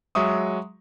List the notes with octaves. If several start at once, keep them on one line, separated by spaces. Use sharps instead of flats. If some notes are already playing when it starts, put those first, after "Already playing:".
F#3 G#3 E5 C#6 D#6